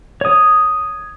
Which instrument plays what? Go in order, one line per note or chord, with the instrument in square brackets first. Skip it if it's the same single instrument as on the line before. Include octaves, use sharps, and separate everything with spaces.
[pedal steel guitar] C#5 D#6